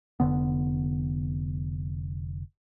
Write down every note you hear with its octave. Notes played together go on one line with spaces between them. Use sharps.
F1 D3 B3